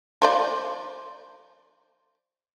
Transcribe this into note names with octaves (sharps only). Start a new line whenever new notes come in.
F3 C5 D5